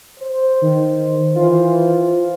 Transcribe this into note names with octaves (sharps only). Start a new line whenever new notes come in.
C5
D#3
E3 F4 C5